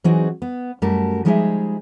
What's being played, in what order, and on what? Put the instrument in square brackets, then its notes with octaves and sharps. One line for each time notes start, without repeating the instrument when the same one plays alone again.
[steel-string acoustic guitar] E3 F#3 C4 D#4 F#4 G#4
B3
F#2 G3 A3 F#4 A#4 A5
F3 G3 G#3 D#4 G#4 E5